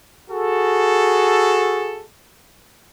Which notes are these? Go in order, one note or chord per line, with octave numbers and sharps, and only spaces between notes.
F#4 G#4 A4